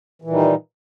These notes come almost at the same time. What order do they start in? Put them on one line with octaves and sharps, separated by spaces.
E3 A#2 D#3 G3 D#4